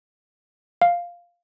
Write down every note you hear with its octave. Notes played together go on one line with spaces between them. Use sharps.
F5